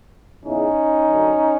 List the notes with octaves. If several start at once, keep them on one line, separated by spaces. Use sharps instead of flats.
E2 C#3 E3 C#4 D#4
F#2 D3